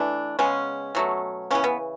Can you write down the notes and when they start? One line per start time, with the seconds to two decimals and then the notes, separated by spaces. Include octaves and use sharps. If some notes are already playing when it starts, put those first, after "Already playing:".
Already playing: E3 A3 D4
0.39 C#3 G#3 B3 C#4
0.95 B2 F#3 A3
1.51 C#3 E3 B3 C#4
1.64 B3